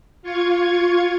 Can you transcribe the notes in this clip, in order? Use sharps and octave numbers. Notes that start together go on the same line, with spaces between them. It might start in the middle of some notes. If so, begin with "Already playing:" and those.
F4 C#6 G#6